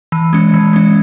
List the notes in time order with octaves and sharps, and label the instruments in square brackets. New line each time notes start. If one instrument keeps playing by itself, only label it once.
[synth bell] E3
G#3 C#4
E3
G#3 C#4